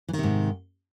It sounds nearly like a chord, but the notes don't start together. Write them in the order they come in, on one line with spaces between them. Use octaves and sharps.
E3 D#3 C3 G#2